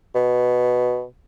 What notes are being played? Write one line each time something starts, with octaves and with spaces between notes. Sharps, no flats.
B2